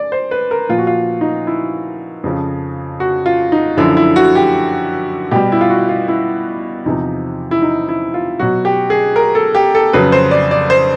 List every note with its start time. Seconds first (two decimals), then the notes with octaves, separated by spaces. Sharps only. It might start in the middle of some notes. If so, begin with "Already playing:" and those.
Already playing: D5
0.12 C5
0.31 B4
0.51 A#4
0.69 A#2 F3 F4
0.78 F#4
0.87 F4
1.21 D#4
1.47 E4
2.24 F2 C#3 F3
3.00 F#4
3.26 F4
3.52 D#4
3.77 F#2 D3 F3 E4
3.97 E4
4.16 F#4
4.35 G4
5.31 B2 G3 G4
5.52 E4
5.61 F4
5.70 F#4
5.89 F4
6.08 E4
6.86 E2 C3 F3 D#4
7.51 E4
7.62 D#4
7.89 E4
8.14 F4
8.39 B2 F#3 F#4
8.65 G4
8.90 G#4
9.16 A#4
9.35 A4
9.55 G4
9.75 A4
9.93 F2 C#3 F#3 B4
10.12 C5
10.31 D5
10.51 D5
10.70 C5